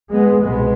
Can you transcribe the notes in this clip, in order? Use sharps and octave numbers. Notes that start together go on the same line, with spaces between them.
G#3 B3
C2 B2 G#3 B3